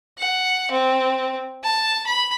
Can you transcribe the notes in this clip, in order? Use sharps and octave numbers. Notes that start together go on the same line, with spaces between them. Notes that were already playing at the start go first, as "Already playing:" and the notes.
F#5
C4
A5
B5